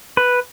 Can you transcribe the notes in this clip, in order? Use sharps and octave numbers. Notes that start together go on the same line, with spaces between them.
B4